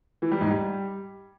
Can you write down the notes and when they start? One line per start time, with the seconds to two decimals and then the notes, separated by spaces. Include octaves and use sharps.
0.22 E3
0.31 G3
0.41 G#2
0.50 G3